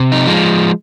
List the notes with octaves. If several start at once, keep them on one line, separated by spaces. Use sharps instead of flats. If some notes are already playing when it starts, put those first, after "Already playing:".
Already playing: C3
D#4
F3 G#3